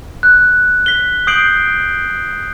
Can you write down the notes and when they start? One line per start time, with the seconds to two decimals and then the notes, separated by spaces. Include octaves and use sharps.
0.23 F#6
0.86 B6 G7
1.27 D#6 G6 C7 D7 F#7